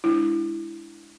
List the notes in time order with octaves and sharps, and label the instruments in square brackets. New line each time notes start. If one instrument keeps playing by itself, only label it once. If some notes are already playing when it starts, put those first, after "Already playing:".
[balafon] G#3 D4 E4